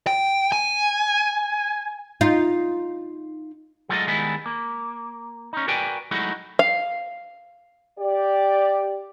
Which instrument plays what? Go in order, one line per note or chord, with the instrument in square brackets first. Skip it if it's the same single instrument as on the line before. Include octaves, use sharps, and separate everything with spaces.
[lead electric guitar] G5
G#5
[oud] D#4 F4
[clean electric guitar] F#3 G#3 A3 F4 D5 D#5
D#3 G3 G#3 B3 E4
A#3
C#4 D#4
F#4 A#4 B4 D5 G5 G#5
F#3 G#3 A3 D#4 E4 F#4
[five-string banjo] F5
[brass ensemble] G4 D5